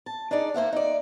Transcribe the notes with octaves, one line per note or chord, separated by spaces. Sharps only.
A5
D4 D#4 G#4 D5
A#3 C5 E5 F#5
D#4 D5